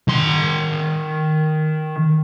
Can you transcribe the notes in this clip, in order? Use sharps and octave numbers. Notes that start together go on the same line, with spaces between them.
D#3 C6